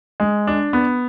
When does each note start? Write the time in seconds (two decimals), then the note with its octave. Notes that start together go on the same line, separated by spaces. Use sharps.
0.20 G#3
0.47 D4
0.73 B3